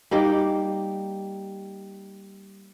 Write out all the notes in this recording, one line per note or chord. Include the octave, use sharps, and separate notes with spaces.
G3 A#3 D#4 G4